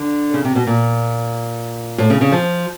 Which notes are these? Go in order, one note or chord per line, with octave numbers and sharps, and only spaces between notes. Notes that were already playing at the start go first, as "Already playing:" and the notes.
Already playing: D3
C#3
C3
B2
A#2
A2
C#3
C#3
F3